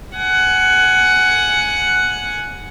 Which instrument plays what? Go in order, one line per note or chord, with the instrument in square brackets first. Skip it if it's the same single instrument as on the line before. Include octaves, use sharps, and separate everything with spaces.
[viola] F#5 G#5